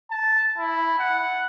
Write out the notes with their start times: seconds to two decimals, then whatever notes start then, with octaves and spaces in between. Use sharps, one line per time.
0.11 A5
0.58 E4
0.99 F#5